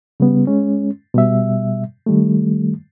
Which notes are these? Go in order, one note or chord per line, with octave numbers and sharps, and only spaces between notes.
C#3 G3 B3
G#3 C#4
B2 G3 E5
D#3 G3 A3